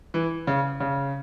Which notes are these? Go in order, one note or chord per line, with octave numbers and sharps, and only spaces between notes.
E3
C#3
C#3